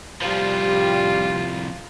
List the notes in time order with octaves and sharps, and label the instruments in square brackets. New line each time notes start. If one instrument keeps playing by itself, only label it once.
[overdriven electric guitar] C2 F3 [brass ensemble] G3 [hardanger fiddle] F4